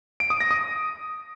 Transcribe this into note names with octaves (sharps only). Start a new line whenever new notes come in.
D7
D#6
A#6
D#6